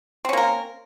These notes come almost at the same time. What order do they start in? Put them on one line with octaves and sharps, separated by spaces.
C4 C#4 A#3 A#4